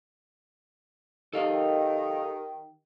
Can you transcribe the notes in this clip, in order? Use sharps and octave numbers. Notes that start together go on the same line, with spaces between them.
D#3 D#4 G4 A4 D#5 F5